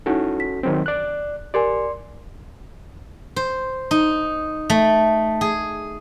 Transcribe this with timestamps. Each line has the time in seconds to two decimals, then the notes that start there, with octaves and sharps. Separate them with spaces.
0.06 C#4 D#4 E4 F#4 A4
0.40 B6
0.63 D#3 F#3 C4
0.86 D5 F#6
1.54 G4 A#4 D5 G#5 C6
3.36 C5
3.91 D#4
4.70 A3
5.41 G#4